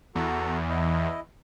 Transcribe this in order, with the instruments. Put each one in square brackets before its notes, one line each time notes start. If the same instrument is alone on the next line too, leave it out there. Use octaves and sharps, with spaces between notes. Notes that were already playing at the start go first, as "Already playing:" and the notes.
[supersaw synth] E2 [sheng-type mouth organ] F#4 A4 A#5
[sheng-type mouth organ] E4 D#5